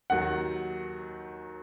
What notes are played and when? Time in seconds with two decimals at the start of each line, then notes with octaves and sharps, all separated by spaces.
0.10 D#2 D#3 F#3 F#5